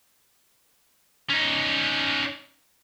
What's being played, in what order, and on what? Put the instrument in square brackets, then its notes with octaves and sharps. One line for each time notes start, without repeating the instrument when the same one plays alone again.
[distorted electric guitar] C#4 D#4